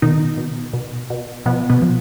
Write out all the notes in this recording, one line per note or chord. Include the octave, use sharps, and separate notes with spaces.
B2 D#3 D#4
B2
B2
B2
B2 F3 B3
B2 B3
F3